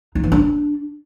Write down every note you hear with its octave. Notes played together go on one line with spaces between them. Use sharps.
D#4
E3
D4